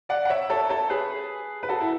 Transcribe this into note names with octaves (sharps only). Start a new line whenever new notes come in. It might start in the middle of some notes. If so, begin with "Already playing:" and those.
D5 F#5
F#5
C#5 E5
A4 C#5
A4 C#5
G#4 B4
B4
F#4 A4
E4